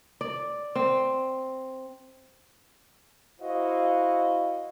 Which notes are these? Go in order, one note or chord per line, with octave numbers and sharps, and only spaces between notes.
D5
C4
E4 F#4 C5 D#5 F5